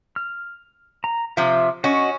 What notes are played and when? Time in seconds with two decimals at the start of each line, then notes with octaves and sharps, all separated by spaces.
0.16 F6
1.04 A#5
1.37 C3 F3 E5
1.84 C#4 F#4 D#5 C#6